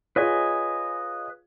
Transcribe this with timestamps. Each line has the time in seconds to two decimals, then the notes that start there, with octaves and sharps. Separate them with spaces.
0.16 F4 G#4 B4 C#5 D#5 G#5